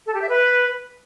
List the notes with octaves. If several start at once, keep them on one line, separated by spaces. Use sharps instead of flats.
A4
G4
E5
B4